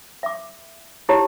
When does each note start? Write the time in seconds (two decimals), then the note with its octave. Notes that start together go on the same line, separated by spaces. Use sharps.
0.23 E5 D6
1.09 D#4 E4 G4 C#5 D#5 A#5